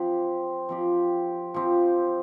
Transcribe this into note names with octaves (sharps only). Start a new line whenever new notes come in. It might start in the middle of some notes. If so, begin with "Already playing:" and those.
Already playing: F3 C4 G4
F3 C4 G4
F3 C4 G4